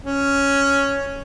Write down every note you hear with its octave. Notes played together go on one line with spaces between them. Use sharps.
C#4